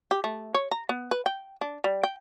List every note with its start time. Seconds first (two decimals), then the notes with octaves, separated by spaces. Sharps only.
0.11 G4
0.24 A3
0.54 C#5
0.71 A#5
0.89 B3
1.11 B4
1.26 G5
1.61 D4
1.84 G3
2.03 G5